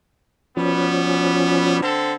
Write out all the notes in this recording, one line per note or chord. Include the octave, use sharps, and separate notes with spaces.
B2 F3 G3 B3 C#4
D3 C4 A4